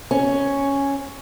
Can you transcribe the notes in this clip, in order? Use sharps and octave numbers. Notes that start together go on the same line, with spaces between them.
C#4